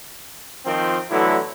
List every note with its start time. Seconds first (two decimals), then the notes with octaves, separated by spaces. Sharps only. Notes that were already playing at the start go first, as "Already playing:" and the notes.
0.66 D#3 F3 C4
1.11 D3 E3 F#3 A3 B3 E4